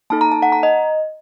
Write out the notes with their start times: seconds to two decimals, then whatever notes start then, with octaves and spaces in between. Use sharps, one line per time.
0.10 A#3 D#4 A4 A5
0.21 A#5
0.32 A5
0.42 F#5
0.52 A#5
0.63 D#5